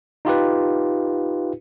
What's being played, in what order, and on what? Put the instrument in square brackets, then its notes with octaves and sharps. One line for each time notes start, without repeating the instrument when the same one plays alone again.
[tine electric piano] D#4 F4 G4 B4